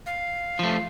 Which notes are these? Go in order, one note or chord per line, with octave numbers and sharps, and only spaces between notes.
F5
F3 A3